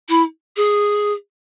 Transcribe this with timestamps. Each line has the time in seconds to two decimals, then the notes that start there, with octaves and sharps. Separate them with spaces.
0.08 E4
0.56 G#4